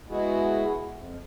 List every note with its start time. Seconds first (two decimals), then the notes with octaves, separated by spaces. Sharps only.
0.09 G#3 B3 E4 F#4 G#4
0.92 F2